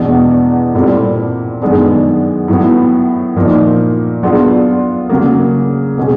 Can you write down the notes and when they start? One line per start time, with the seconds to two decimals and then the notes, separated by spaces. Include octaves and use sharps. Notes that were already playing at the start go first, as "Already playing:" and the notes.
Already playing: E2 B2 G#3 B3 D4
0.74 A#2 G3 C4 E4 A4
1.62 F#2 D#3 G#3 B3 D4
2.48 A2 F#3 B3
3.36 A#2 F3 A#3 D#4
4.23 F#3 B3 D4 F4 G#4
5.09 C#3 F#3 A#3
5.98 B2 G#3 C#4